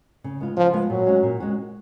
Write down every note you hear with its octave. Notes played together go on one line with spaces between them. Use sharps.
C#3
G#3 B3 F4
C#3 F3
G#3 B3 F4
A#2 F#3
G#3 C#4 F#4
A#2
G#3 C#4 F#4